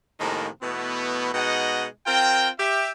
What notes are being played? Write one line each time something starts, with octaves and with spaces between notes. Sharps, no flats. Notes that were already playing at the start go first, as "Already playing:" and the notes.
A2 C3 D#3 F3 G#3 A#3
B2 E3 A3 B3
B2 G#3 D#4 D#5 F#5
C4 F4 A#4 G5
G4 E5